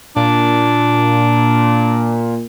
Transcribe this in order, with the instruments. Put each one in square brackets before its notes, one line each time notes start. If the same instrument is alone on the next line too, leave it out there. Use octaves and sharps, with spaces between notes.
[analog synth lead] A#2 [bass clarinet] D4